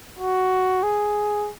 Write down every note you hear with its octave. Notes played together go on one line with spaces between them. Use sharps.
F#4
G#4